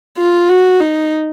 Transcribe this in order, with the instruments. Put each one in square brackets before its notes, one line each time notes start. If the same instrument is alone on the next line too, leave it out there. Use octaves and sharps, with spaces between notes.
[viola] F4
F#4
D#4